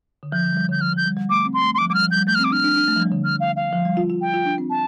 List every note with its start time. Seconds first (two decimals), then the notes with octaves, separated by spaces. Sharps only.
0.23 D3
0.32 F3 G6
0.45 D3
0.53 G3
0.57 F3
0.69 D3 G6
0.81 F3 F6
0.93 F3 G6
1.05 G3
1.17 G3
1.29 A3 D6
1.45 C4
1.54 C6
1.62 A3
1.74 C6
1.78 D6
1.81 F3
1.89 G3 D6
1.94 F6
2.02 F3
2.11 G3 G6
2.27 A3 G6
2.35 F6
2.39 C4
2.44 D6
2.51 D4 F6
2.64 D4
2.76 D4
2.88 A3
2.96 F3
3.00 G3
3.12 D3
3.24 F6
3.40 F5
3.56 F5
3.73 F3
3.85 G3
3.97 F4
4.10 F4
4.21 G5
4.34 F4
4.45 D4
4.58 C4
4.70 A5